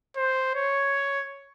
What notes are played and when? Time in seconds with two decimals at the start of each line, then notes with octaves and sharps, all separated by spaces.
0.16 C5
0.55 C#5